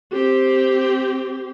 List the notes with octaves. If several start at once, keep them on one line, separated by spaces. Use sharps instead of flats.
C4 G4